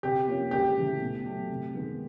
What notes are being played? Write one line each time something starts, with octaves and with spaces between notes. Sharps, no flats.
C3 G4
F3 A#3 C#4
C#2 G4
C#3 E3 A3
B2
F#3 A3
C3
D#3 G#3 B3